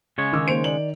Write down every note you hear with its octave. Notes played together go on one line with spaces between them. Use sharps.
C#3 G#3 C#5
D#3 D#4 D6 E6
A#3 C5 D7 F7
D5 F#7